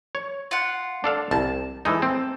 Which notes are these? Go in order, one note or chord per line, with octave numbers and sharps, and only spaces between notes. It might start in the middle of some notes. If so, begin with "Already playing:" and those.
C#5
F4 F#5
D4 A4 F5
C2 A5
E3 G#3 D#4 A4
C4